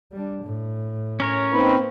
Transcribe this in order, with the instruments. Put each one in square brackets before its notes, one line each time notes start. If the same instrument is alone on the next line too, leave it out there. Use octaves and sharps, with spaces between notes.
[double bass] G3 D4
A2
[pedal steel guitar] C#4 A#4 C#5
[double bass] A#3 [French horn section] C4 D#4 [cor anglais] B4